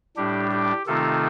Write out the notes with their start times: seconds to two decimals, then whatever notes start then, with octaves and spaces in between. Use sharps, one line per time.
0.17 A2 G3 D4 G4
0.51 G4
0.87 C3 D#3 A3 C4 D#4 F4 A4